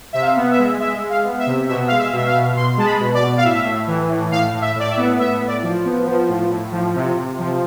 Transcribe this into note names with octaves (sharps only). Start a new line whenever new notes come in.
C3 E5
F5
B3
E5
G#3
G#3 E5
G#3
F5
B3
E5
C3
B2 E5
G#3 F5
E5
B2 E5
F5
B2
B2 C6
G#3 A5
B5
B2
D5
B2
F5
A2 E5
A2
E3
A2
A2 F5
A2
E5
A2 D5
E5
B3
A2 E5
A2
D5
F3
B3
F3
A2
A2
F3
C3
C3
F3